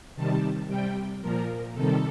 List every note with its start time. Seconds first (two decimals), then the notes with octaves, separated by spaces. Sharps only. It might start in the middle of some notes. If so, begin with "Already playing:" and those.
0.16 C3 D#3 G3 A5
0.68 C3 G3 G5
1.21 A#2 F3 A#4
1.74 C3 D#3 G3 A4